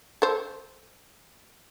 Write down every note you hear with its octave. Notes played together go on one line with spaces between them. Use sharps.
A4 C5